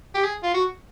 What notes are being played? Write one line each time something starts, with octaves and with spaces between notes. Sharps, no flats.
G4
G#4
F4
F#4